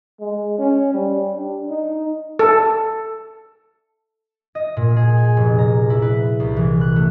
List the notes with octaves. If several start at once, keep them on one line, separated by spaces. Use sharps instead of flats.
G#3
C#4
G3
D4
D#4
A4
D#5
A#2
G#4
G#5
F1
A#5
E4
B4
C2
E3
F#6
A3